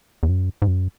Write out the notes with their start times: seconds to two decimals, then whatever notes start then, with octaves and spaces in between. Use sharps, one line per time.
0.23 E2
0.29 F#2
0.62 G#2
0.68 F#2